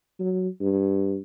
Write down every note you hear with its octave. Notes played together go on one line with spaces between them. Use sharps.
F#3
G2